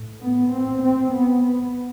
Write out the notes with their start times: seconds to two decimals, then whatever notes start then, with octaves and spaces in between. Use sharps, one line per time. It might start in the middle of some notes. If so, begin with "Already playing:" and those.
Already playing: A2
0.21 B3
0.51 C4
0.82 C4
1.12 B3